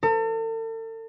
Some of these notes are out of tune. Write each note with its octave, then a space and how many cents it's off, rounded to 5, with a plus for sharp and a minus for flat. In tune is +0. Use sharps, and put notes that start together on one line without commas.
A4 +40